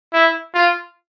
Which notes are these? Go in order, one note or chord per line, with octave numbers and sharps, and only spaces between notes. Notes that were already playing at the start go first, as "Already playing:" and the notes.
E4
F4